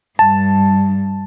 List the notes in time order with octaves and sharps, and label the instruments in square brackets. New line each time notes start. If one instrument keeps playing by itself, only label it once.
[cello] G2 [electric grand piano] A5